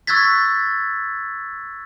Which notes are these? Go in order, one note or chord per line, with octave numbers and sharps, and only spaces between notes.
C#6 E6 F#6 G#6 A6 B6